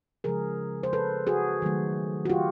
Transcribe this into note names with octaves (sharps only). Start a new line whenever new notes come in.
C#3 F3 G#3 G#4 A#4
C5
A4 B4
F#4 G#4
D#3 F#3 A3
F#4
F4 G4